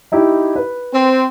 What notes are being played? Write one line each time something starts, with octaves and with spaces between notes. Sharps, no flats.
D#4 E4 G4
B4
C4